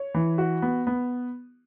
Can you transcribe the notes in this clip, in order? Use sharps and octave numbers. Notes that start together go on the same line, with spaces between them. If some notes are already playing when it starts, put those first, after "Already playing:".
Already playing: C#5
E3
F#4
B3
B3